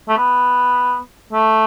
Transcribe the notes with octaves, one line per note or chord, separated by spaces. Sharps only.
A3
B3
A3